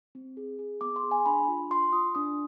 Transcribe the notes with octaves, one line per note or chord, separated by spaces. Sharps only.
C4
G#4
G#4
B3 D6
C6
G#4
G#5
D4 B5
F4
F4 C6
F4 D#6
D4 D#6